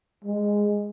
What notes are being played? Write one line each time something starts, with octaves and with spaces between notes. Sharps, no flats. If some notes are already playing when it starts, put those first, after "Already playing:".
G#3